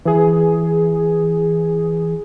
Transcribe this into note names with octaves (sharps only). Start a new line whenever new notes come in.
E3 G#4